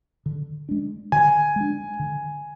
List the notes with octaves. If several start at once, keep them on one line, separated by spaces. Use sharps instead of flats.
D3
G#3 D4
D3 G#5
G#3 D4
D3